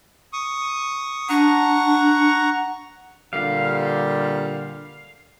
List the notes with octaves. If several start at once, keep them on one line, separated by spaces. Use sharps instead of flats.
C#6 D#6
D4 F#5 A#5 C#6
A#2 D3 G3 F5